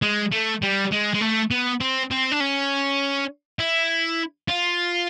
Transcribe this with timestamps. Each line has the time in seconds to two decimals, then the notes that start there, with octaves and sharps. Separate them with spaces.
0.02 G#3
0.32 A3
0.62 G3
0.92 G#3
1.14 G#3
1.21 A3
1.51 B3
1.81 C4
2.11 C4
2.32 D4
2.40 C#4
3.59 E4
4.48 F4